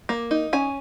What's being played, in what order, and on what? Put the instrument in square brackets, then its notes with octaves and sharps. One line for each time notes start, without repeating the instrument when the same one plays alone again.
[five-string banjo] A#3
D#4
C#4 G#5